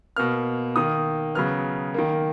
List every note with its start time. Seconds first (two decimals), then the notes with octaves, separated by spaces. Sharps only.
0.16 B2 A#3 F6
0.76 D#3 A#3 D#6
1.35 C#3 F#3 B3 F6
1.94 D#3 A#3